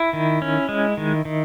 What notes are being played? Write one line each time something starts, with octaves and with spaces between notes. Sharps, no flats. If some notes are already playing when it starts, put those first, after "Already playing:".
Already playing: E4
D#3
C#4
G#3
D#3
D#3